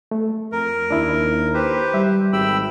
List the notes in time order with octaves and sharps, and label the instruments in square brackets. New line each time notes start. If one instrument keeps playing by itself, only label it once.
[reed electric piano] A3
[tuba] F2 [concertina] A#4
[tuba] D#2 [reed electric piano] D4 E4
[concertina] G4 B4 C5
[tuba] G3 [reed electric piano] E5
[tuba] G#1 [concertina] G5 B5 E6